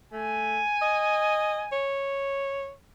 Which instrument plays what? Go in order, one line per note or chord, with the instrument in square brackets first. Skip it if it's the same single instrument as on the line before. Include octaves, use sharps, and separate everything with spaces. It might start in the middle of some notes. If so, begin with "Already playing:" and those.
[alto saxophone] A3 [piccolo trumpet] G#5
[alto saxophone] D#5
C#5